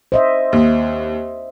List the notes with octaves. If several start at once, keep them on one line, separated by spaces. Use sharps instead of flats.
C5 D#5 E5
D#2